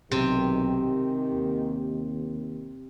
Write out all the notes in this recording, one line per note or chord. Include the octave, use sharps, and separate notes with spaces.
B1 G#2 C3 D#3 G4
D#2